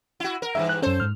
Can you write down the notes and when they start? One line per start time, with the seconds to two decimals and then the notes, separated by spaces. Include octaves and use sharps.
0.20 E4 F#4
0.42 A#4
0.55 G2 D#3 E3 E5
0.69 F#6
0.82 F#2 C#4 A4 C5
1.00 G#2 F6